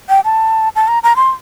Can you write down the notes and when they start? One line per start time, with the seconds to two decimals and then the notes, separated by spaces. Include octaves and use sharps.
0.09 G5
0.25 A5
0.76 A5
0.88 A#5
1.03 A#5
1.16 C6